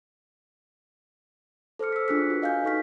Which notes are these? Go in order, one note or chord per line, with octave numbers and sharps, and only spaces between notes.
A4 C5 D6 F6 C#7
E6 B6
D4 F4 G#4 F#6 B6
F#4 B4
D#5 F5 G#5 G6
D#4 A4 C#6 F6 B6